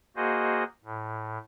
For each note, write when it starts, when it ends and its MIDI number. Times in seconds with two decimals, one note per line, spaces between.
0.16 0.64 58
0.16 0.64 66
0.16 0.64 68
0.16 0.64 72
0.16 0.64 75
0.84 1.38 45